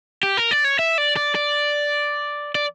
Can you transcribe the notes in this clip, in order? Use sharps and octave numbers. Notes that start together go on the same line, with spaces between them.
G4
A#4
D5
C#5
E5
D5
D5
D5
D5